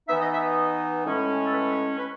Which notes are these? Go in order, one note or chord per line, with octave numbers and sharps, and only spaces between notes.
E3 B3 D#4 E5
D#5
E5
D#5
A2 G#3 C#4
A4
B4
B4